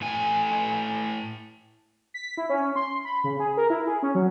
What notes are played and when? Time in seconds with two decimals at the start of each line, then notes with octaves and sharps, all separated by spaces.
0.01 A2 A3 G#5
2.14 B6
2.37 E4
2.49 C#4
2.76 C6
3.05 B5
3.24 C#3
3.40 G#4
3.57 A#4
3.70 E4
3.87 G#4
4.03 C#4
4.15 F#3